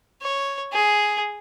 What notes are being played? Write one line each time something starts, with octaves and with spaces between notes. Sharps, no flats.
C#5
G#4